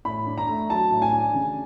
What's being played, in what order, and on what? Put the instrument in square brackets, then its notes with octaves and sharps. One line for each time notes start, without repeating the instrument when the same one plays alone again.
[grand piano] A2 B5
D4
A#5
A3
F#3 A5
A2
G#5
D4
C#3